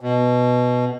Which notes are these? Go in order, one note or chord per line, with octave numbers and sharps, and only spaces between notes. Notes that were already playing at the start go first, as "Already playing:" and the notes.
B2